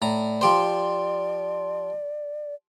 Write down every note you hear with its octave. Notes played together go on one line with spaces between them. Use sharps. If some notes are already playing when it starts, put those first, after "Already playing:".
A2 D5 A#5
F3 G4 C5